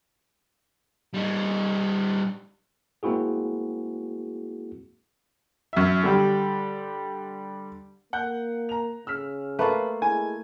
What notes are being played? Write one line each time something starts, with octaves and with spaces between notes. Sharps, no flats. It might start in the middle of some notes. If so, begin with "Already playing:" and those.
G3 D#4
G#3 A#3 C4 E4 F#4 G#4
F#2 E5
D3 G3 G4
A#3 F#5 F#6 G6
A#5 F7
C#3 E6 F6 B6
A3 A#3 F4 B4
G#3 E4 G#5